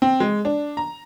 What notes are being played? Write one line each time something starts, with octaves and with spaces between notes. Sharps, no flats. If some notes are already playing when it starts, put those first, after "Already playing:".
C4
G#3
D4
A#5